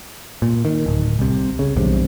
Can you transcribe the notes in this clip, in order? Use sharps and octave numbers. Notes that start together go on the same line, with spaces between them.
A#2
D#3
D1
C2 C3
C#3
B1 E2 G2 C3